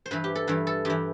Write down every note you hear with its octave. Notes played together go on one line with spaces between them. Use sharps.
C5
G2 E3 B4
G4
A4
G2 E3 B4
A4
G2 E3 G4